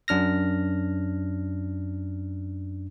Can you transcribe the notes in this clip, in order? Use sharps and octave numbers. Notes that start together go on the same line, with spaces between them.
F#2 D4 F6 A#6